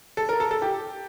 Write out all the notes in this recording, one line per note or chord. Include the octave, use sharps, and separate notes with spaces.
A4
A#4
A4
A4
G4